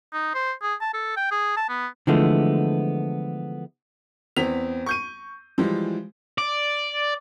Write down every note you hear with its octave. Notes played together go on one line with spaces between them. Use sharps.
D#4
C5
G#4
A5
A4
G5
G#4
A5
B3
D3 E3 F3 G#3 A3 B3
E2 B3 C4 B6 F7
C#6 G6 D#7
E3 F3 G3 G#3
D5